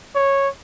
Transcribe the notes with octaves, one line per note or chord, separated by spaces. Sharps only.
C#5